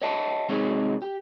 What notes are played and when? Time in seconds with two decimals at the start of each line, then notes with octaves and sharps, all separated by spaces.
0.02 C#5 D#5 E5 F#5 A5
0.49 C3 G#3 C4 D#4 G#4 C#5
1.02 G4